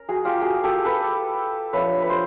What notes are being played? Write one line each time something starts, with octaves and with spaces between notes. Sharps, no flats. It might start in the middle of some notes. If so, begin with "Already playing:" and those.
Already playing: C#4 A#4
F#4 G#4
F4 G4
F#4 G#4
G4 A4
A4 B4
F3 A3 D4 B4 C#5
B4
C5